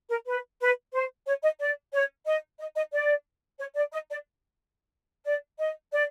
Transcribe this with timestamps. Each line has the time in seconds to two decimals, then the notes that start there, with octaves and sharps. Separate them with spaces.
0.10 A#4
0.27 B4
0.60 B4
0.93 C5
1.26 C#5
1.43 D#5
1.60 D5
1.93 C#5
2.26 D#5
2.60 D#5
2.76 D#5
2.93 D5
3.59 C#5
3.75 D5
3.92 D#5
4.09 D5
5.25 D5
5.59 D#5
5.93 D5